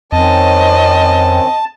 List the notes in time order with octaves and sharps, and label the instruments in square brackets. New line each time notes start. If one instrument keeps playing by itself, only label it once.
[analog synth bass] F2 [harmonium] D#3 C4 C#4 [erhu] D#5 [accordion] A5